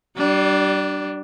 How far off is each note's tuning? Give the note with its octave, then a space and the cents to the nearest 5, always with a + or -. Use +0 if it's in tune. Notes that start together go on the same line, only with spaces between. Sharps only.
G3 -35 D4 +5